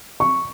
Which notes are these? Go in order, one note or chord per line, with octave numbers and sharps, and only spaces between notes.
C#6